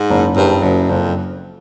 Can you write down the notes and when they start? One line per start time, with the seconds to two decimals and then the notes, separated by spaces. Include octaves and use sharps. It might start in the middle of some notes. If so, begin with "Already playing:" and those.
Already playing: G#2
0.10 F#1
0.36 F#1 G2
0.63 F#1 F#2
0.89 F#1 F2